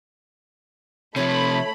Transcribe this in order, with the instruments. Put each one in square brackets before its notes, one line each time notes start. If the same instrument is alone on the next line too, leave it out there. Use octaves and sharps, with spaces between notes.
[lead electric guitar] C3 F3 [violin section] A3 B5 [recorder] C#5